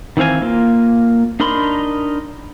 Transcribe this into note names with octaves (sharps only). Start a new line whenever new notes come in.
D#3 E3 C4 F5 G#5
A#3 F4
D4 D#4 A#4 B5 C6